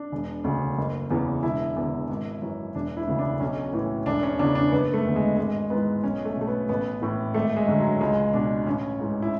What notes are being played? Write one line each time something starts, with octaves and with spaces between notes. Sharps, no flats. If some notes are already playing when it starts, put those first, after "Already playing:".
Already playing: D4
E1
D2 C#3
F#1
E2 C#3 E3
E1 E4
E2 D3
G#1
F#2 E3
E1 D4
E4
D2 C#3 E3
D4
B1 C#4
A2 E3
E1 D4
C#4
E2 C#3 E3 D4
D4
F#1 B3
A3
E2 D3
G#3
G#1 G#3
G#2 E3 B3
B1 C#4
A3
B2 A3
B3
A1 B3
A2 E3
G#1 A3
G#3
F#2 D3
F#3
C#2 G#3
B2 D4
A1 C#4
G#2 E3
E4